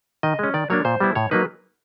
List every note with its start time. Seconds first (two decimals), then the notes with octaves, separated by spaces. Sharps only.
0.23 D#3 D#5
0.39 G#3 C#4
0.54 D#3 D5
0.70 F#3 A#3 D4 C#5
0.85 A#2 C5
1.00 G3 B3 E4
1.15 A2 C#5
1.31 F#3 A#3 D#4 B4